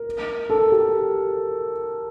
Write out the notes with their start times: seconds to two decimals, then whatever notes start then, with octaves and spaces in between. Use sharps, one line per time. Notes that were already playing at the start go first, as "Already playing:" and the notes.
Already playing: A#4
0.50 A4
0.72 G4